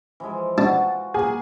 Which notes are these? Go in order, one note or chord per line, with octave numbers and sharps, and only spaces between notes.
E3 F3 G#3
D4 F4 F#4
A#3 G#4 G#5